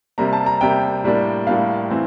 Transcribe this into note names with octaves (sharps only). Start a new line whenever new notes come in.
C3 G3 A#3 A#5
A5
A#5
C3 G3 A#3 G5
A2 G3 A#3 D4
A2 G3 A#3 D4 F5
E3 A3 C4